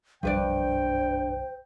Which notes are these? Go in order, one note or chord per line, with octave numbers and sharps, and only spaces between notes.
F#1 B1 G2 F3 B4 C5 D5 G5